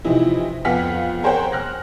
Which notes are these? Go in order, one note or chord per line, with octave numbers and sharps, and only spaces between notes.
C3 E3 F3 D#4 E4
F2 B3 F5 F#5 F6 B6
G#4 A#4 C5 C#5 F#5 G5
F6 F#6 A#6